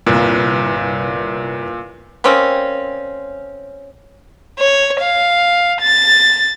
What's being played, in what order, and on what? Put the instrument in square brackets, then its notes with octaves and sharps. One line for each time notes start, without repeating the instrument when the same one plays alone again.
[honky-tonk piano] G1 C2 [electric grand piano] A#2
[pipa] G3 A#3 C4 C#4
[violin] C#5
F5
A6